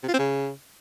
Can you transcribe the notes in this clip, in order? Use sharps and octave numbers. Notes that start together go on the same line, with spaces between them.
C3
F4
C4
C#3